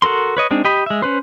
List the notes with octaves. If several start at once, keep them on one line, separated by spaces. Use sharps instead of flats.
F#4 A4 A#4 C6
B4 C#5 D#5
G#3 C4 D4 D#4
G4 D#5 B5
G#3 E5
C#4 B4 C5